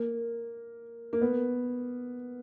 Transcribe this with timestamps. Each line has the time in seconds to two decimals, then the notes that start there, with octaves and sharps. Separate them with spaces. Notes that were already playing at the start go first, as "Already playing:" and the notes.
Already playing: A#3
1.13 A#3
1.21 B3